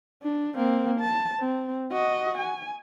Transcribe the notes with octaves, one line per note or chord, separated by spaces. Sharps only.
D4
A#3 C4
A5
C4
F#4 D#5
G#5